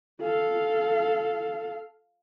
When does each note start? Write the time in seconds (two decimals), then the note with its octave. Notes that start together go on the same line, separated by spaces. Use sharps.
0.22 A4 F5